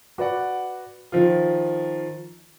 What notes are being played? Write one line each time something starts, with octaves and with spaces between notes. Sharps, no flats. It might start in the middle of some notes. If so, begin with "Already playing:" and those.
F#4 B4 D5 F#5
D#3 F3 F4